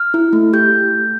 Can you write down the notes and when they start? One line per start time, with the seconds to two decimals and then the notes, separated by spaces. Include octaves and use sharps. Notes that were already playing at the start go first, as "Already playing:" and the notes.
Already playing: F6
0.14 E4
0.33 A3
0.53 G4 G6